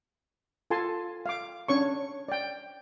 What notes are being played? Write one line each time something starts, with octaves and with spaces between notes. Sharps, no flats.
F4 A4 G#5 A5 C6
F5 D6
C#4 D4 C#5 C#6
D5 G5